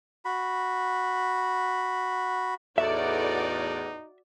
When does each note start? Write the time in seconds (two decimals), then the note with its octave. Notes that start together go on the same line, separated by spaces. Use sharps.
0.25 F#4 B5
2.78 E2 A2 D#4 F#4 D5 E5